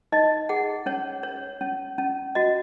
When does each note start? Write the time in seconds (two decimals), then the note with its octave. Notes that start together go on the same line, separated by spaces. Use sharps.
0.12 D#4 D#5
0.49 G#4 F#5
0.86 C#4 C#5
1.23 C#5
1.61 C#4
1.98 C#4
2.35 F#4 D#5